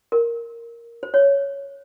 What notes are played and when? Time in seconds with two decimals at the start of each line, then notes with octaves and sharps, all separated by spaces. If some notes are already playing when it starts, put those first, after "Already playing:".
0.12 A#4
1.03 C5
1.14 C#5